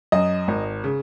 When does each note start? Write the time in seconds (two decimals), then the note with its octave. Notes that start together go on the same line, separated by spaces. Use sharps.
0.12 F#2 D#5
0.48 G#1
0.84 C#3